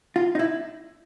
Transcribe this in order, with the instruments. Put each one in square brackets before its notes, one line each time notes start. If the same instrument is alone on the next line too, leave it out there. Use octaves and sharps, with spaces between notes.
[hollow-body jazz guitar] F4
D#4
E4